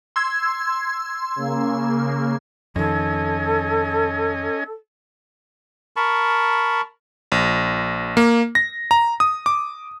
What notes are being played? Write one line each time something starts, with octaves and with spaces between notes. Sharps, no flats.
C6 E6 G#6
C#3 A#3
F2 D#3 C#4 A4 D#5 G#5
A#4 A5 B5 C#6
A#1
A#3
A#6
A#5
D#6
D6